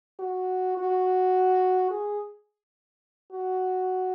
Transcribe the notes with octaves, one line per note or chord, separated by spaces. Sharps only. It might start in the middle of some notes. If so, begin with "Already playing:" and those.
F#4
F#4
G#4
F#4